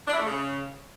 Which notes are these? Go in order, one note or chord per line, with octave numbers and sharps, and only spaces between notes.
D4
E4
A3
C#3